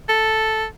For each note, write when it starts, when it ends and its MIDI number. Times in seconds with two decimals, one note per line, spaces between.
0.09 0.65 69